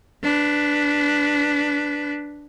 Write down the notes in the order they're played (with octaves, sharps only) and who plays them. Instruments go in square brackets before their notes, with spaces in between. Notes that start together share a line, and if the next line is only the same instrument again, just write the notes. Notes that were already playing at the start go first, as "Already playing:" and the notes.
[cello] D4 B4